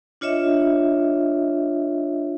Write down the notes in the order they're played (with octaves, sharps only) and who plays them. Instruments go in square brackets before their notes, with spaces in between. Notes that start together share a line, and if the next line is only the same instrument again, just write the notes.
[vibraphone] D4 F4 C#5 D#5 E5